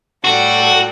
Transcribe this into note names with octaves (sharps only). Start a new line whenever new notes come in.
A2 G3 F#4 A4